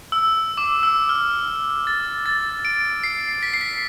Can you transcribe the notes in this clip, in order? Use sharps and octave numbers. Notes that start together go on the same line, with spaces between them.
E6
D6
E6
F6
A6
A6
D7
C7
B6
C7
B6